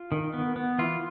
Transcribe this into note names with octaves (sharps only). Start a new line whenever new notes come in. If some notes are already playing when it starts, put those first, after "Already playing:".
Already playing: F4
D#3
B3
B3
E3 F4